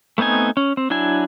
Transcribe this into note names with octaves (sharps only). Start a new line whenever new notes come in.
A3 B3 C4 D#4 G#5
C#4
C4
F#3 D4 E4 G#5